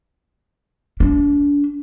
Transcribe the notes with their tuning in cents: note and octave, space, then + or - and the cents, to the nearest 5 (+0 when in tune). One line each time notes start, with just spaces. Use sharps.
D4 -35